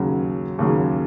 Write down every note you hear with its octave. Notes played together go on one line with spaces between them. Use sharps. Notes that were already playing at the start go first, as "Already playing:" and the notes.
Already playing: D#2 C#3 F#3
D#2 C#3 F#3